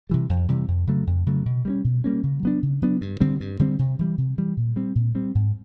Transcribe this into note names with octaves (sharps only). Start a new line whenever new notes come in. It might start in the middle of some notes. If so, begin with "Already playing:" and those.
C3 E3 G3
F2
C3 E3 G3
F2
C#3 F#3 A3
F2
C#3 F#3 A3
B2
G3 A#3 C#4
B2
G3 A#3 C#4
C#3
F#3 B3 D4
C#3
F#3 B3 D4
G2
D3 G3 C4
G2
D3 G3 C4
C3
E3 G3
C3
E3 G3
A#2
G3 C4
A#2
G3 C4
G#2